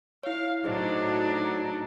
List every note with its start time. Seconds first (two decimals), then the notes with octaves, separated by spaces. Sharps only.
0.23 E4 C#5 F5
0.64 A2 F#3 D4 D#4 G#4 C5 D#5